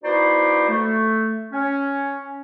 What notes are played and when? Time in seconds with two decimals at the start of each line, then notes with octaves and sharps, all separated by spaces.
0.04 B3 D#4 E4 F#4 C5 D5
0.69 A3
1.52 C#4